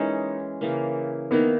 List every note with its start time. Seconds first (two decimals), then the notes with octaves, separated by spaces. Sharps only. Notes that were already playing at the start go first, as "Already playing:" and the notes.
Already playing: E3 G#3 A#3 C#4 D#4
0.61 C#3 E3 A#3
1.31 D#3 A#3 B3 E4